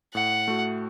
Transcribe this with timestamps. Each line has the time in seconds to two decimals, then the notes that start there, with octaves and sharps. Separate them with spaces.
0.14 A2 F#5
0.48 A3 F#4